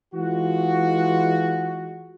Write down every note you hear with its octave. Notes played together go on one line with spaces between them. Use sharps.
E3 G#3 F4 F#4